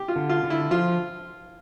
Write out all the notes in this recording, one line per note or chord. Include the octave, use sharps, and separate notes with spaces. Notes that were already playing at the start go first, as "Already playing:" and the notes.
Already playing: G4
F4
D3
F4
D3
E4
F3 F4